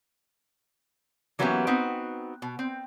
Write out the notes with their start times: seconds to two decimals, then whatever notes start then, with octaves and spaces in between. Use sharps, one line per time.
1.39 E3 F#3 A#3 B3 C#4 G4
1.67 B3 C4 D#4 F#4
2.42 B2
2.59 C4